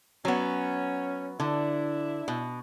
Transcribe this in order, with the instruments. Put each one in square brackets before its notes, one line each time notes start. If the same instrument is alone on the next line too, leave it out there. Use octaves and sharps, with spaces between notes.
[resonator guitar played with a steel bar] F#3 B3 [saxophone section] C#4
[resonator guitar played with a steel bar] D3 [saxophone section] D4 E4
[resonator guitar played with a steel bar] B2